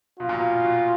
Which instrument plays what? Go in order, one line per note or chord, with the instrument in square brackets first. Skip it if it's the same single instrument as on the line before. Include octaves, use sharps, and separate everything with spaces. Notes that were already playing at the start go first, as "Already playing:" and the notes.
[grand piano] B2 [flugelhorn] F4
[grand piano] A#2
B2
B2